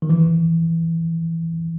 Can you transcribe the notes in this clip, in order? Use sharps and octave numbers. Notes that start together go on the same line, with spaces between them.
D#3
E3